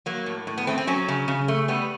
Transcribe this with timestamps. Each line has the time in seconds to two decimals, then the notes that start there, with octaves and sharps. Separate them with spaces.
0.06 F#3 A#3
0.26 A2
0.47 A2
0.58 B3
0.67 A3 C4
0.78 C4
0.87 F#3 C#4
1.08 C#3
1.28 C#3
1.48 A3
1.68 G3 B3